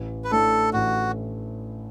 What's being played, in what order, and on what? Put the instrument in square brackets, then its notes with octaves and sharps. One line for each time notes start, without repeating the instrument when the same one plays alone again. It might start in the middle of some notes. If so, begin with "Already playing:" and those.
Already playing: [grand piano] A1
[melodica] B4
[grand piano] A2 A3 D4 [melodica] A4
[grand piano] A1 [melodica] F#4